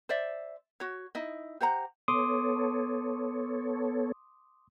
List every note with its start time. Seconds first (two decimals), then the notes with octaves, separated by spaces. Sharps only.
0.09 C5 D5 E5
0.80 F#4 C#5
1.15 D#4 E4 D#5
1.61 G4 C5 F#5 A#5
2.08 B3 A4 C#5 C6 D6 D#6